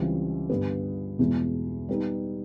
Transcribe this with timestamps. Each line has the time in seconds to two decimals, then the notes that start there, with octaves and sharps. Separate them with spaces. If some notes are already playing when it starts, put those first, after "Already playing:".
Already playing: C#2 C#3 E3 G3 C4
0.50 G2 D3 G3 B3
1.19 E2 B2 G#3
1.89 G3 B3 D#4